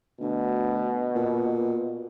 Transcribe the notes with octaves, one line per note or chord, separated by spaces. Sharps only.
D2 B2
A#2